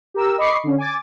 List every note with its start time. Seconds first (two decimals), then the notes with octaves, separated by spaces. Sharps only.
0.14 G4 A#4 E6
0.38 D#5 B5 C#6 D6 C7
0.64 D3 C#4
0.78 G#5 D6 A6